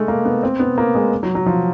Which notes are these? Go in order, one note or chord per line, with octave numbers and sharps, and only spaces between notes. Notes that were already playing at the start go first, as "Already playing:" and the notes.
Already playing: G#3 A3
A#3
B3
C4
B3
A#3
G#3
F#3
F#3
F3